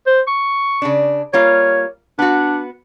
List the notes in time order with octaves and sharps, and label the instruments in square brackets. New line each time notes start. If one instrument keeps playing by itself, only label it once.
[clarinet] C5
C#6
[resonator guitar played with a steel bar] C#3 D4
[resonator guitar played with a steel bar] G3 A#3 F4 [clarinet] C#5
[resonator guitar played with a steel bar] B3 F#4 [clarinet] D4